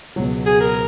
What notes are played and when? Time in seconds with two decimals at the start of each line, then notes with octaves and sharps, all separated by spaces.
0.16 C#2 B2 F#3
0.46 G#4
0.61 A#4